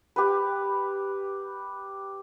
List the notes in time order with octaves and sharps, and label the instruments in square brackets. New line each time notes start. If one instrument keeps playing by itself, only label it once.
[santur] G4 B4